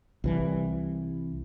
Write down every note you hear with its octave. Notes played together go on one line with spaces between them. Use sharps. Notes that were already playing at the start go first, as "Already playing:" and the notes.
C2 E3 G3